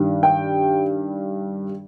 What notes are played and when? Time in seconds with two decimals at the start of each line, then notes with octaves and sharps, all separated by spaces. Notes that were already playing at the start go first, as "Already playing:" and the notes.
Already playing: G2 D#3 G3
0.23 G5